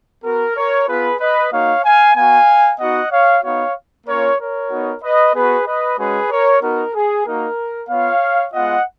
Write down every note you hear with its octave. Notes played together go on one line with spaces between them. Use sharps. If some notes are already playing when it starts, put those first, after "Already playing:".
B3 F#4 A#4
A#4 C#5
B3 F4 G#4 B4
B4 D#5
A#3 D#4 F#4 C#5 F5
F5 G#5
B3 F#4 F5 G#5
B3 D#4 F#4 D#5 F#5
C#5 F5
B3 D#4 F#4 C#5 F5
A#3 C#4 F4 A#4 C#5
A#4 C#5
B3 D#4 F#4
B4 D#5
B3 F#4 G#4 B4
B4 D#5
G#3 C#4 F#4 G#4 B4
A#4 C#5
B3 D#4 F#4 A#4
G#4
A#3 D#4 F#4 A#4
B3 F4 C#5 F5
G#3 B3 F4 D#5 F#5